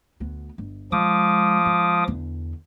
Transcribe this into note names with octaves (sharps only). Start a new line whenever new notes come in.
D2 B3
G1
F3 G#3 D6 D#6
G#3
E2 D3